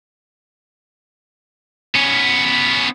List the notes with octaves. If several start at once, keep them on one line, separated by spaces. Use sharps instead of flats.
B3 C#4